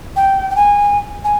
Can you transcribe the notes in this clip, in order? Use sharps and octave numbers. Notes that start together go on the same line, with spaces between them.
G5
G5
G#5
G#5